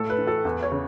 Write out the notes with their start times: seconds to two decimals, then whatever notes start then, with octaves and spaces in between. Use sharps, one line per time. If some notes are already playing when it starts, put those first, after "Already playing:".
Already playing: A2 A4
0.10 B4
0.18 E3
0.27 A4
0.45 E2 B4
0.63 C#5
0.72 C#3